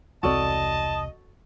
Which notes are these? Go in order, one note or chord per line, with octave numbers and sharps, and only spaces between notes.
E1 C2 C4 F#4 A4 D5 D#5 A5